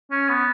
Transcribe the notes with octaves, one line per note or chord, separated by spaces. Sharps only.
C#4
B3